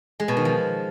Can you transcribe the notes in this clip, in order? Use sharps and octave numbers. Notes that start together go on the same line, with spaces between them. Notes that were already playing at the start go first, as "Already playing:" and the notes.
G#3
B2
D#3
F3